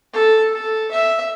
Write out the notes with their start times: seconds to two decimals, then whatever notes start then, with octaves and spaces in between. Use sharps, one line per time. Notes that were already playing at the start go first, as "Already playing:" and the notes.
0.13 A4
0.52 A4
0.92 E5